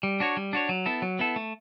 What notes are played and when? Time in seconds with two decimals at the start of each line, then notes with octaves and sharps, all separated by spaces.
0.03 G3
0.20 D4 F#4 C#5
0.37 G3
0.53 D4 F#4 C#5
0.69 F#3
0.86 B3 E4 A4
1.02 F#3
1.19 B3 E4 A4
1.36 A3